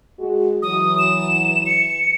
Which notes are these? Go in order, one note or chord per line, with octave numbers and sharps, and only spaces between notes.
G#3 F#4
E3 F#3 D#6
E7
C#7